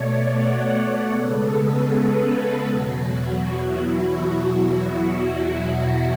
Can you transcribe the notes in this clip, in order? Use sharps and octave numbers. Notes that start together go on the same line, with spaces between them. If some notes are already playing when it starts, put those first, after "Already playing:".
Already playing: B2 A3 C#5 D5
F#5
F#5
C#3 G#3 B3 A4
B4
B4
A4
E2 B2 F#3 F#4
F#4
E4
F#4